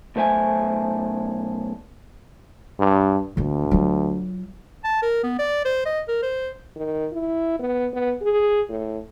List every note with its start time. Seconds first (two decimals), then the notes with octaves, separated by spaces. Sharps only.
0.16 B1 A3 C5 E5 G#5
2.79 G2
3.37 D2 D3 A#3
3.71 F#3 F4
4.84 A5
5.02 A#4
5.24 B3
5.39 D5
5.65 C5
5.86 D#5
6.08 A#4
6.23 C5
6.76 D#3
7.13 E4
7.59 B3
7.93 B3
8.22 G#4
8.70 A2